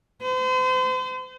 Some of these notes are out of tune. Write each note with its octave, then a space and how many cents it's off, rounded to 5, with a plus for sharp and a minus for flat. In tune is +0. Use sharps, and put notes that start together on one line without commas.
C5 -40